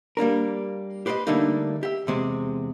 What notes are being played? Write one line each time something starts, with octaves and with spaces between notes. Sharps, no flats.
G3 A#3 D4 A#4
G4 B4 C5 D5 D#5
D3 G3 A3 A#3 D4 D#4
G4 E5
E2 C3 G#3